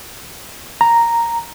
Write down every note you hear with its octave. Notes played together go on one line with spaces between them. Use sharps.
A#5